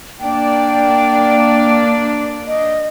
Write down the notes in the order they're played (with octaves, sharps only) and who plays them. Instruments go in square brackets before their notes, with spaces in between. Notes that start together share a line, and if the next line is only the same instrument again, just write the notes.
[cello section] A#3 D4 D5 [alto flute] G5
[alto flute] D#5